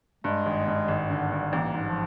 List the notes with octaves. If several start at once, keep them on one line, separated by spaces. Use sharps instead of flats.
G2 G#3
G#1
G2
G#1
D3
G2
A1 A#3
G#2
F3